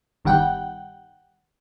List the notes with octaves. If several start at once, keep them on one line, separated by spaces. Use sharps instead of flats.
G1 D#3 G3 F#5 G5